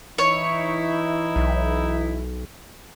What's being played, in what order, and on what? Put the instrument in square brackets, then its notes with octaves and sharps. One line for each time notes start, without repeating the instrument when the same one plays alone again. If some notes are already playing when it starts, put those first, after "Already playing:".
[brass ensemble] E3 D#4 E4 [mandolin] C#5
[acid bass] B1